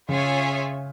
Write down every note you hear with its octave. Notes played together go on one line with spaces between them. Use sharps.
C#3 F4 G#4 C#5 E5 G#5